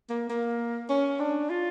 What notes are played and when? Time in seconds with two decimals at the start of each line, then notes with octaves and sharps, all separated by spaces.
0.10 A#3
0.30 A#3
0.90 C#4
1.20 D4
1.50 F4